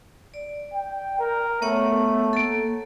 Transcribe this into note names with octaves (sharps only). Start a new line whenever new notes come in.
D5
G5
A#4
A3 B3 C#5 F#5
A#3 A4